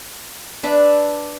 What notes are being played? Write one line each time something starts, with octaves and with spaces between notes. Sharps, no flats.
D4 B4 D5 E5